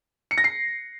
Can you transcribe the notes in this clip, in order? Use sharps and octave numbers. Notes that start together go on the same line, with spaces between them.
C#7
A#6
C7